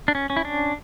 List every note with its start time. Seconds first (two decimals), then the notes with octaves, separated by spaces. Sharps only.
0.08 D4
0.15 C#4
0.30 C#4
0.36 E4
0.45 D4